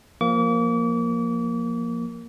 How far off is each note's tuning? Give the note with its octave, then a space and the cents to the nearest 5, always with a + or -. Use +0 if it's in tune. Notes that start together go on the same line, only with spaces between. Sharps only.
F3 +0 A#3 +5 D6 -40